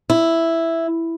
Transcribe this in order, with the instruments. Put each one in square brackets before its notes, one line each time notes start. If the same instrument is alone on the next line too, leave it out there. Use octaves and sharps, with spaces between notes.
[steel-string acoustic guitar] E4